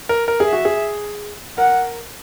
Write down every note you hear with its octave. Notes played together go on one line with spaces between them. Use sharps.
A#4
A#4
G#4
E5
F#4
G#4
A#4 F#5